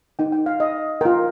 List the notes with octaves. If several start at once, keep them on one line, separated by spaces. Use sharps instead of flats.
D#4 A#4 G5
G5
F5
D#5
F4 A#4 G5